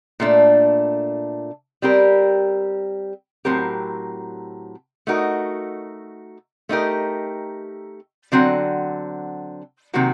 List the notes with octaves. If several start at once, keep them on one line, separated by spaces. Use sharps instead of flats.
A#2 A3 D4
G3 C4 G4 A#4
A2 F#3 C4 G4 A#4
A3 D#4 F#4 A#4
A3 D#4 G4 A#4
D3 F#3 C4 F#4
C3 D#3 F#3 A#3 F#4